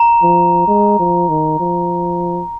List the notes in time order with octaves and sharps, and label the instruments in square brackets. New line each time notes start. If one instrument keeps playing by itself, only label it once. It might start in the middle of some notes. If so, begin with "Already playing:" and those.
Already playing: [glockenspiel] A#5
[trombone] F3
G#3
F3
D#3
F3